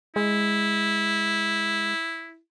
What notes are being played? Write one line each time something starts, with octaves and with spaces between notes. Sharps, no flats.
G#3 E4